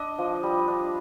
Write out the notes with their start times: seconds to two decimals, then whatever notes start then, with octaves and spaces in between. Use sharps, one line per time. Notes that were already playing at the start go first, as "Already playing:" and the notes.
Already playing: D4 D#5
0.18 F3
0.43 G3
0.68 D4